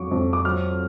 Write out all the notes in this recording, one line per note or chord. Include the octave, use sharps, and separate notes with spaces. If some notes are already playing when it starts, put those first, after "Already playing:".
Already playing: F2 F#3 C#6 D6
F2
D6
F#3 F6